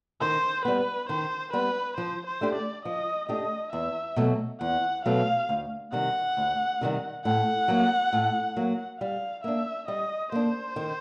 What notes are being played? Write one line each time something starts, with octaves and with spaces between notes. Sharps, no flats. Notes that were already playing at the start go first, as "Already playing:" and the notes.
D#3 C5
G3 B3 B4
D#3 C5
G3 B3 B4
F3 C5
C5
A3 D4 G4
D5
F3 D#5
A3 D4 G4 D#5
E2 E5
B2 F#3 A3
E2 F#5
B2 F#3 A3 F5
D2
C3 D#3 G3 F#5
D2
C3 D#3 G3
A2 F#5
F#3 A#3
A2
F#3 A#3
G3 F5
A#3 D4 E5
G3 D#5
A#3 D4 C5
D#3